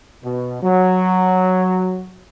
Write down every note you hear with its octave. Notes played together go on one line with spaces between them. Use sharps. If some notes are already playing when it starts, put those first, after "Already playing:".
B2
F#3